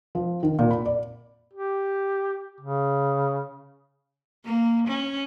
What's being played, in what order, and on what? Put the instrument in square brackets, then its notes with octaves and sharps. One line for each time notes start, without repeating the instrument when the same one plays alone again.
[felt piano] F3
D#3
A#2
B5
D5
[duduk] G4
C#3
[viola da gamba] A#3
C#4